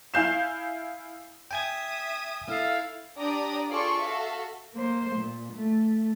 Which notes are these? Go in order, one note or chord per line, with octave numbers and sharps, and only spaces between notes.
E4 F5 G#5 G6 C7 E7
E5 G5 G#5 D#6 G#6
E4 A4 F5
D4 G4 D5 A#5 D#6
F4 G#4 A4 D5 C6 C#6
F#4 A4 E5 F5
A#3 C5
A#2
A3